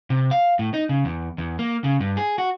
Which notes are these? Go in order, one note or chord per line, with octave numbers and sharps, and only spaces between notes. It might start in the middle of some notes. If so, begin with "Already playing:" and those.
C3
F5
A2
D#4
C#3
E2
E2
A#3
C#3
G2
G#4
F#4